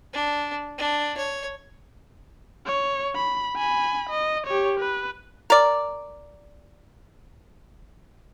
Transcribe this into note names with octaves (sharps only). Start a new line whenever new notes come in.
D4
D4
C#5
C#5
B5
G#5 B5
D#5
G4 C#5
B4
A#4 D5